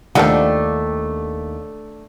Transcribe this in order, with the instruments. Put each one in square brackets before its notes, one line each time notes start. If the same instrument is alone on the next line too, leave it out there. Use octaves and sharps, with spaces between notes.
[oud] D#2 G4 [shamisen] F3 A#4 F#5 [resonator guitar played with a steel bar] A3 D4